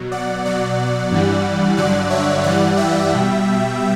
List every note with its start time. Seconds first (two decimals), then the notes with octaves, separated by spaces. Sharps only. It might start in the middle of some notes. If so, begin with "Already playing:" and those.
Already playing: B2 F#3
0.12 D5 F#5
0.45 B2 F#3 D5 F#5
1.11 G2 E3 G3
1.77 G2 D3 F#3 D5 F#5
2.10 C#5 E5
2.43 G2 E3 G3 D5 F#5
2.77 E5 G5
3.10 B2 G3